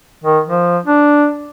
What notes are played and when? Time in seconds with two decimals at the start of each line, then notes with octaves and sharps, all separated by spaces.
0.24 D#3
0.48 F3
0.85 D4